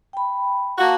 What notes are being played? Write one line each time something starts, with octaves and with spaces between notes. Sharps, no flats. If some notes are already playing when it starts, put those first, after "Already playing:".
G5 B5
A#3 F#4 F5 A5